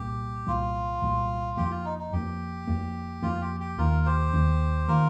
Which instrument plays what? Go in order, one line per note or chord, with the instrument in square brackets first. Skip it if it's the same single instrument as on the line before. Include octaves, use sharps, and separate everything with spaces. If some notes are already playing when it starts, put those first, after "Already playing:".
Already playing: [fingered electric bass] C2 A#2 G3 A#3 [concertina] G4
[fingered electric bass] C2 A#2 G3 A#3 [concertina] F4
[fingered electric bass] C2 A#2 G3 A#3
[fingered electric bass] F2 F3 A#3 [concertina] G4
[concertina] F4
D#4
D#4
[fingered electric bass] F2 F3 A#3 [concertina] G4
[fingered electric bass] F2 F3 A#3
[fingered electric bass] F2 F3 A#3 [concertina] F4
[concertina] G4
G4
[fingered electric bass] D#2 D#3 A#3 [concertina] F4 A#4
[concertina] G4 C5
[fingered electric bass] D#2 D#3 A#3
[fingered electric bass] D#3 A#3 [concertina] F4 A#4